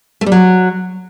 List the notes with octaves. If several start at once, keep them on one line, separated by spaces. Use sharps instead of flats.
A3
G3
F#3